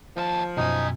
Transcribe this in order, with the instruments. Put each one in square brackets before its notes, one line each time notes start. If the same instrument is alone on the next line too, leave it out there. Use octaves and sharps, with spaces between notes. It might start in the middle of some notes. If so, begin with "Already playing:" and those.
[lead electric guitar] D#2 A5 [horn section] F3
[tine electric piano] F#2 B2 [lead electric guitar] D#3 G#5 [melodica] D#4